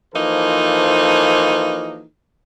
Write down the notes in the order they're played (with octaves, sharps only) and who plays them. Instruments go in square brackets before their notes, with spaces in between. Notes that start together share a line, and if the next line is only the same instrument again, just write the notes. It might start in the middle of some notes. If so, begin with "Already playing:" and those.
[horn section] E3 F3 A#3 D#4 A4 C5